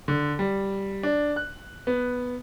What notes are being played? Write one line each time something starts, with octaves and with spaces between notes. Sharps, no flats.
D3
G3
D4
F#6
B3